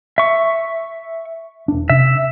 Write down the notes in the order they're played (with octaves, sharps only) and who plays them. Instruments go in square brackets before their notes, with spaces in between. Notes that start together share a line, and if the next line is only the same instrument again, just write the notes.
[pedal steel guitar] E5 C#6
[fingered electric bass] E1 D4
[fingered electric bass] C3 [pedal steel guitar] E5